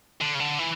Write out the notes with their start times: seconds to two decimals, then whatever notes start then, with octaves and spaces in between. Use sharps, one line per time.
0.21 D3
0.35 C#3
0.40 D3
0.59 E3